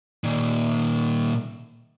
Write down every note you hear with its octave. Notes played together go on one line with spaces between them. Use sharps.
A#2 D#3